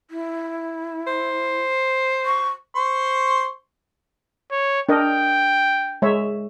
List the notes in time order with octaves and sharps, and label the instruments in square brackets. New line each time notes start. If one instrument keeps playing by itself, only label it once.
[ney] E4
[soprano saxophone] C5
[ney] C#6
[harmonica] C5 C6 C#6
[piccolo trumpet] C#5
[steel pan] D4 A#4 D#5 [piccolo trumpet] G5
[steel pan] G#3 C#5 E5